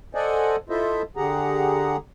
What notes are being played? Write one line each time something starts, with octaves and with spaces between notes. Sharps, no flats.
A4 C5 D5 D#5 F#5 G#5
E4 F4 A4 C5 D#5 E5
D3 G4 G#4 F#5 A#5